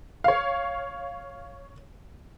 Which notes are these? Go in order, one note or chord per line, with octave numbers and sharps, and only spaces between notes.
C#5 F5